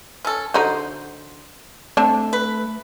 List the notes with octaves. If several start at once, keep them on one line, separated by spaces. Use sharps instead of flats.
C#4 A4
D3 D#4 F#4 C5
A3 C4 D4 A5
B4